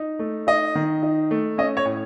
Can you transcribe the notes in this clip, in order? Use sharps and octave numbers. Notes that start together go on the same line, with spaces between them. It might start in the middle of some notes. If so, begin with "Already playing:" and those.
Already playing: D#4
A3
D#4 D#5
D#3
D#4
A3
C#4 D#5
C#5
A2